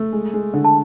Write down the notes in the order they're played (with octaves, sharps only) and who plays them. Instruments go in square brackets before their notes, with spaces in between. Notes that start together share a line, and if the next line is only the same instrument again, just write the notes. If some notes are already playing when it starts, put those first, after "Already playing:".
Already playing: [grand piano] A3
G#3
G#3
D3
[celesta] A5